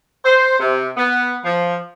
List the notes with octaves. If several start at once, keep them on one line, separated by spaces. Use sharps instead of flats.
C5
C3
B3
F3